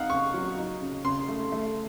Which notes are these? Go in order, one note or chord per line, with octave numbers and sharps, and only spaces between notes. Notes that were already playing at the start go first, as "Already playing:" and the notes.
Already playing: C4 D#4 F5 F#5
C#3 C#6
F#3
D#4
C#3
C#3 C6
A3
A3